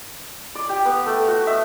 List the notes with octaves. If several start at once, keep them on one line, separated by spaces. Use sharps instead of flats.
D5
G4
B3
A3
F#4
E5